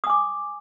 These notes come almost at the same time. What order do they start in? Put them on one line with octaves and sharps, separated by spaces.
D#6 G#5 D6